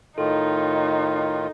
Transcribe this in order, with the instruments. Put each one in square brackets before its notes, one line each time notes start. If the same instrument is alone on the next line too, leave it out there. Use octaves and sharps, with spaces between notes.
[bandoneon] A2 D#3 F4 [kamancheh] D#4 [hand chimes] A4